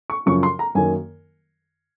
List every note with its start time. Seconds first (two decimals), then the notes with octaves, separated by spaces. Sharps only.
0.10 C#6
0.26 F#2 C#3 F3 C#6
0.43 C6
0.59 A#5
0.75 F#2 D#3 F#3 A#3 G#5